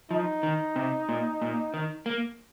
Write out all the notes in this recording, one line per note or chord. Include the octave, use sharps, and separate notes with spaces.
F3 D#4
D#3
C3
A#2
A#2
D#3
A#3